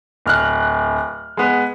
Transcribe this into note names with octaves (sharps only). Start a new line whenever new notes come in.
D1 F6 F#6
G#3 B3